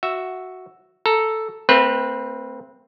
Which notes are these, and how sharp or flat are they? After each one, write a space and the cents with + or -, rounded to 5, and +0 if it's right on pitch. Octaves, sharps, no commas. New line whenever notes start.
F#4 +0 E5 +0
A4 +0 A#5 +0
A3 +45 C4 +0 B4 -20